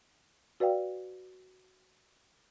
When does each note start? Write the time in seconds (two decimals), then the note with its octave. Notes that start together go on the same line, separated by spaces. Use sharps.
0.60 F#4 B4 D5 F5 G5